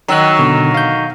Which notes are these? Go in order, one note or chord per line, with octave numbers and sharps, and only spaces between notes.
D#3 F#3 A#5 E6 F#6
B2 D3
F5 G6